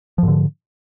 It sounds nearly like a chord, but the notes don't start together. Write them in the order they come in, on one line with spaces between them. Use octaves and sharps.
F3 G#2 D3